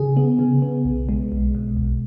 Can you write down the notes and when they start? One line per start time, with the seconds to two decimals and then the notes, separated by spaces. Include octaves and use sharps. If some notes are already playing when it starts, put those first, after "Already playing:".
Already playing: C#3 G#4
0.17 B3
0.39 C#3
0.62 B3
0.85 B1
1.09 G#3
1.32 B1
1.55 B2
1.77 B1